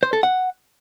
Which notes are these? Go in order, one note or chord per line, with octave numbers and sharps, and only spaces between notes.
C5
A4
F#5